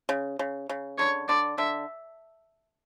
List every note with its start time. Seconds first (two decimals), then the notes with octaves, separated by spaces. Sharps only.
0.09 C#3
0.39 C#3
0.69 C#3
0.98 D3 C#5
1.28 D3 D5
1.58 D3 E5